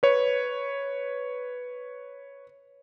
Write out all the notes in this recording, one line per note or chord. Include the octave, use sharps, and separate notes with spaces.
B4 C#5